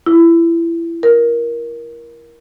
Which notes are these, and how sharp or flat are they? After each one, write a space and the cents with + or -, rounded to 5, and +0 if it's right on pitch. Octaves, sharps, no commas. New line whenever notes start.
E4 +25
A#4 +15